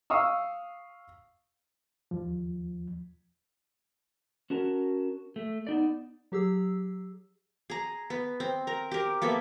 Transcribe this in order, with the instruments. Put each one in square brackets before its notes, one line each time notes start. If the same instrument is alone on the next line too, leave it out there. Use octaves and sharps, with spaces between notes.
[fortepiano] F5 C#6 D#6 E6
[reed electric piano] D#2 F3
[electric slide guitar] C#4 F#4 A#4 A5
A3
B3 D#4 D5
[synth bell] F#3 G4 G#4 E6
[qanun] G#4 A#5
B3
C4
A#4 A#5
G4 A#4
A#3 B3 A4 E5